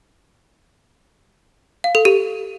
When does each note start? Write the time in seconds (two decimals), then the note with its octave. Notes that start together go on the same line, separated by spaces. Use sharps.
1.84 F5
1.95 A4
2.05 G4